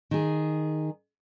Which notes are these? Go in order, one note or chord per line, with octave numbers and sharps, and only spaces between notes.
D#3 G#4